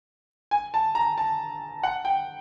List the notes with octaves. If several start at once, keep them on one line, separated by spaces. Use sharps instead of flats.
G#5
A5
A#5
A5
F#5
G5